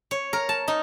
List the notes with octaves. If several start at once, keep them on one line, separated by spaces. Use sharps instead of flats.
C#5
A#4
A5
D#4